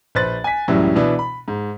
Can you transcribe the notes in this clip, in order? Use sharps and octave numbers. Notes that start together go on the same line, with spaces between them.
A#1 B4 C5 F#6 A6
G#5 B6
C#2 F#2 A2 E3 F#3 G3
B2 E3 B3 D4
B5
G#2